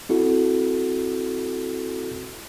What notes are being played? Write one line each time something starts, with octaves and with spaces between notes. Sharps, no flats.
C4 E4 F#4 A4